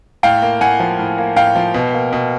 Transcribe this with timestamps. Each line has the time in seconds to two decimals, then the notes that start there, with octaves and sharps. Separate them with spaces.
0.23 A2 F5 G5
0.42 A#3
0.61 A2 F#5 G#5
0.80 F3
0.99 A2
1.18 A#3
1.36 A2 F5 G5
1.56 F3
1.74 B2
1.93 A#3
2.13 B2